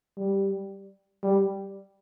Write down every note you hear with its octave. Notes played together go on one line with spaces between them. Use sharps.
G3
G3